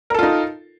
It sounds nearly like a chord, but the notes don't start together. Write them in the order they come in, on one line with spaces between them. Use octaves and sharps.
A#4 A4 F4 D#4